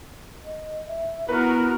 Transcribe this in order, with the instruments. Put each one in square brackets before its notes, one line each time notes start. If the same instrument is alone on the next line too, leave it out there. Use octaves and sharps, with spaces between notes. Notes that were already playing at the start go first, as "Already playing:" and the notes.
[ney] D#5
E5
[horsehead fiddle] B3 [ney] E4 [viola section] F#4 A#4 [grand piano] B4